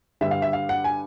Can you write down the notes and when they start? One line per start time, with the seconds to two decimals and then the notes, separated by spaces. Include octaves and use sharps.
0.21 G2 D3 G3 E5
0.31 F5
0.42 E5
0.53 F5
0.69 F#5
0.84 G#5